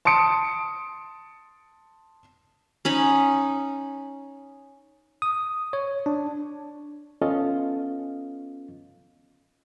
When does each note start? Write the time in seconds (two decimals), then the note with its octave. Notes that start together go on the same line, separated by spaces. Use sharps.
0.05 A5 C6 D#6 C#7 D7
2.85 C#4 D#4 B5
5.22 D#6
5.73 C#5
6.06 D4
7.21 B3 C#4 F4 A4 D#5 F5